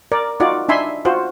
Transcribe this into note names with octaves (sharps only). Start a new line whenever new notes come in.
A#4 D5
D#4 F4 F#4 D5
D4 D#4 E5 G#5 B5 C6
F4 F#4 C5